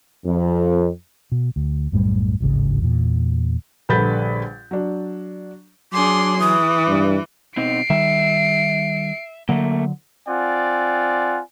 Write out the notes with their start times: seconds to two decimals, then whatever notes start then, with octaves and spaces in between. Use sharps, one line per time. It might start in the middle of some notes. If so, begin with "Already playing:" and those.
0.25 F2
1.32 B2
1.56 D2
1.92 B1 F#2 A2 G3
2.40 D1 G#1 C#3
2.81 E2 A#2
3.89 A#1 D3 G3 B4 G6 A6
4.71 F#3 D4
5.93 F#3 D4 G#4 C6 D6
6.40 E3 D#6
6.88 G2
7.57 B2 C4 D#4 C7 D7
7.90 D#3 G3 E5
9.49 D3 F#3 A3 A#3
10.28 C4 F4 D5 F#5 G#5